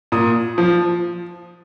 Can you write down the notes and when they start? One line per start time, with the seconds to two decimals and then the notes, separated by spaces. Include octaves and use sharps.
0.12 A#2 D#6
0.58 F3